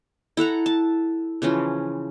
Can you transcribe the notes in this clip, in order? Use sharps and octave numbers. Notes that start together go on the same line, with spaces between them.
E4 A4 F#5 A#5
A5
C#3 E3 F3 C#4